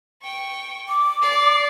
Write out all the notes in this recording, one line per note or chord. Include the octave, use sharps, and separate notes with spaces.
G5 C#6
D6
D5 C7